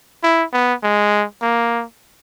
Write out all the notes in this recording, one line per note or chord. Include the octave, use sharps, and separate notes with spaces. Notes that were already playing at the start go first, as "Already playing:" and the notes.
E4
B3
G#3
A#3